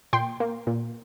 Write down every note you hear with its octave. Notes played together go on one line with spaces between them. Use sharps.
A#2 G5 C6
A#3
A#2